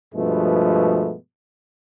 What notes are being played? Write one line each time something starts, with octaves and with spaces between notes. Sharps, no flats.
G2 B2 F3 G#3 A3 B3